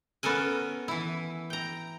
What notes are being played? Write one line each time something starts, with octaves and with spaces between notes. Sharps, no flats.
B3 C#4 A4 A#4 G#5
E3 E4
G5 A#5